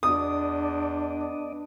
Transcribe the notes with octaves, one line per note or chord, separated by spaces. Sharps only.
E2 B3 D4 D5 D#5 D#6